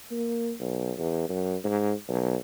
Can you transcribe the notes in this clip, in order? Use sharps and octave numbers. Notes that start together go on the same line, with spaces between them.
A#3
B1
E2
F#2
G#2
B1